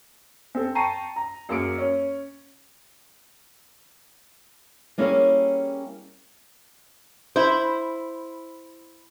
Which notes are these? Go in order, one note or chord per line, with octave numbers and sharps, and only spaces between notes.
C4 A4
G5 A5 A#5 C#6 C7 D#7
A#5
F#2 A#3 G#4 C#7 D7
C#4
G3 A#3 C#4 E4 G#4 C#5
E4 C5